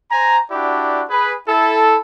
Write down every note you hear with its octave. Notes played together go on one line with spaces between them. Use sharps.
C5 G#5 A#5
D4 E4 F#4 G4 D5
G#4 B4
E4 A4